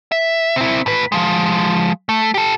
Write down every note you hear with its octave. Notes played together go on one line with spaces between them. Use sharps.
E5
C4 E4
A2 B4
F3 G#3
A3
G4 A4